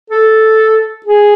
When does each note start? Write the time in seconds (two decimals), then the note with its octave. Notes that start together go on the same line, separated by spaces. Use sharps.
0.10 A4
1.05 G#4